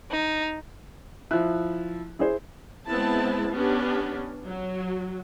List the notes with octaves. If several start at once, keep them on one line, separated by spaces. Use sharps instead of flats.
D#4
F3 E4 F#6
E4 G#4 C5
G#3 B3 C4 E4 A5
B3 C#4 D4 G4
F#3